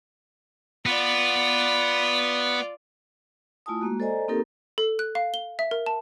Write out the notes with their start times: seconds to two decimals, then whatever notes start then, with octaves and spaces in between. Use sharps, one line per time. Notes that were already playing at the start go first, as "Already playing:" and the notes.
0.86 B3 F4 D5
3.66 A3 E4 F4 G#5 A5 D#6
3.81 G#3 A#3 F#4
4.00 A4 C5 D5 D#5 G#5 A#5
4.28 A#3 C4 D#4 G4 A4 A#4
4.78 A4
4.99 F#6
5.15 F5
5.34 G7
5.59 E5
5.71 A#4
5.86 A5